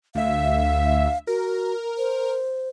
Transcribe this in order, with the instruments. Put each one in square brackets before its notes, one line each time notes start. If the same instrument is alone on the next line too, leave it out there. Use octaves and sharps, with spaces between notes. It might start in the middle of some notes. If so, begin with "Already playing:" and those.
[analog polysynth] D2 E5 [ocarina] F5
[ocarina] F#4 [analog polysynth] A#4
[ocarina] C5